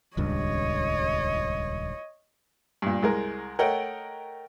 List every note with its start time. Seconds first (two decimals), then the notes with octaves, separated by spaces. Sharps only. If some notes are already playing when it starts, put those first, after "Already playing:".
0.17 D#1 C#2 G2 C#5 D#5
2.82 G2 A#2
3.03 C2 G#3 A#4
3.59 A3 A#4 C#5 D#5 F#5 G5